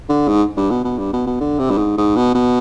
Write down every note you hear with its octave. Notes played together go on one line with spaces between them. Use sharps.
D3
G#2
G2
B2
B2
G2
B2
B2
D3
C3
G2
G#2
G#2
B2
B2